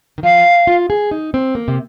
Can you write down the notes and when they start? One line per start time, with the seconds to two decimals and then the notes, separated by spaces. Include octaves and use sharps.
0.18 D#3
0.23 F3 F5
0.67 F4
0.90 G#4
1.11 D#4
1.34 C4
1.55 A#3
1.68 C3